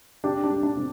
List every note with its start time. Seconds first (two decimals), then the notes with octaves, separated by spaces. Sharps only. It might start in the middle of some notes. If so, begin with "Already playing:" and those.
0.24 C3 D4 G4
0.44 D4
0.50 G3
0.63 D4
0.77 C3